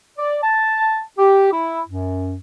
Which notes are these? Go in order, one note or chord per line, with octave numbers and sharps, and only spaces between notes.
D5
A5
G4
E4
F#2